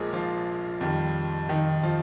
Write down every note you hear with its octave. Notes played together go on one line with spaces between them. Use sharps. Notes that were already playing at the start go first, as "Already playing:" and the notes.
Already playing: A#1 A#2 F3 G#3 A#3 G#4 A#4
F3 F4
F2 D#3 G3
D#3 D#4
F3 F4